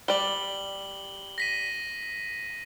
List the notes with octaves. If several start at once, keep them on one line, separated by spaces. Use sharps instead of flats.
G3 D5 F#7 G7
A#6 B6 D#7